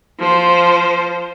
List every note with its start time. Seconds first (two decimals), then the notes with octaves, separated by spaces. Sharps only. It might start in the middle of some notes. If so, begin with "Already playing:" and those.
0.20 F3 C5